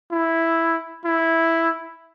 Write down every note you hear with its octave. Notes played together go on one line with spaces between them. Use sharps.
E4
E4